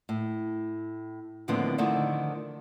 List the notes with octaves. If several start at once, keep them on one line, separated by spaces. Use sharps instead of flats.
A2
D#2 A2 D3 F3 B3 C4
D3 D#3 F3 A3 D#4